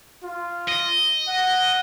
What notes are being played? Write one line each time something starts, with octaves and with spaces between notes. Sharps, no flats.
F4
D#5
F#5